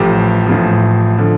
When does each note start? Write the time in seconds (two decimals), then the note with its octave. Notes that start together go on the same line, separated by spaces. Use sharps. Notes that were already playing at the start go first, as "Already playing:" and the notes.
Already playing: A1 A2 F3 G4
0.47 A1 A2 F3
1.18 D3 F3